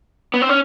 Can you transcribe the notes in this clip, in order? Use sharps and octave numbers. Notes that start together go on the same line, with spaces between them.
B3
C4
C#4